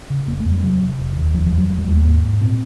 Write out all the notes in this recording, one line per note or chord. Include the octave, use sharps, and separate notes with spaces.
C#3
F1 A#3
A3
F2
G3
C3 F#3
C3
F1
D#2
F1 F3
F3
F2
F#3
E1 F#3
G3
D#2 G#3
A3
G#2 A#3
G#2
A#2 C4